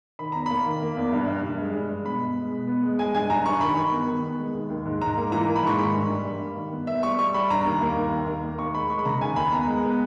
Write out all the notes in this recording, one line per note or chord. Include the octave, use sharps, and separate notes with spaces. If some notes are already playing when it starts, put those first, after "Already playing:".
D#3 B5
E2 A#5
A#3 B5
D#3
A#3
E2
G2
G2
G2
G#3
G2
G#3
B2 B5
B3
G#3
B2
B3
G#3
G#3 G#5
G2 G#5
G2 A#5
G2 C#6
D#3 B5
D#3 B5
B3
D#3
B3
G#3
D#2
D#2
G#2
G#2 A#5
A#3
E3 A#5
A#3
B5
G#2 C#6
D#3 B5
G2
G3
G2
A#3
D#3
B3
B3 E5
G3 C#6
G3 C#6
G3 B5
G2 A#5
D#2
A#3
D#2
D#2
D#2
A#3
D#2 C#6
G#3 B5
G#3 C#6
B5
C#3 A#5
D#2 G#5
D#2 B5
B3 A#5
G#3
B3